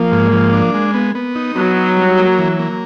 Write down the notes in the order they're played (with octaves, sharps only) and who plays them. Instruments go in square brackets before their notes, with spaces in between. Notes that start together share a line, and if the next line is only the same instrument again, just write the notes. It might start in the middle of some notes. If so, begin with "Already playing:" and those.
Already playing: [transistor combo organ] F3 [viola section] A#3
[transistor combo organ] G#2
F3
D4
G#3
B3
B3
D#4
[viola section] F#3 [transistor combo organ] B3
[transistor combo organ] D#4
G3
A#3
E3
A#3